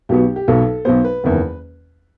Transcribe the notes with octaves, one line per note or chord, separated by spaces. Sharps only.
B1 B2 F#3 B3 G4
G4
B1 B2 F#3 B3 A4
B1 B2 F#3 B3 C5
B4
F#1 E2 D#3